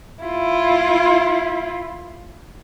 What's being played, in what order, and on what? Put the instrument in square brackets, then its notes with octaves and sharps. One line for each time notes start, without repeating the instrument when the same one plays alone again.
[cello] E4 F4